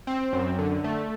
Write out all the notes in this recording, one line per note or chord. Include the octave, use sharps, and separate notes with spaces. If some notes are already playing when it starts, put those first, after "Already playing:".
C4
F#2
D3
A3